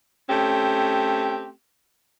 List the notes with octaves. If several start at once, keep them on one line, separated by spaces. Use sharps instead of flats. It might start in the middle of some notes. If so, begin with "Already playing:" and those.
A3 C4 C#4 G4